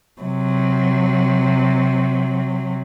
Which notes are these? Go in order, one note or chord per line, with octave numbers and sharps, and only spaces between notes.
C3 F#3